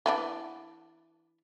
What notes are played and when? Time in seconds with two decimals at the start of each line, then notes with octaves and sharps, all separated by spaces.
0.06 E3 B3 D4